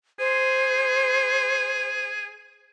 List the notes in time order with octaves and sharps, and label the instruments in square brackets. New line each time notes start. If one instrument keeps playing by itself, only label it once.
[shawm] G#4 [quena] C5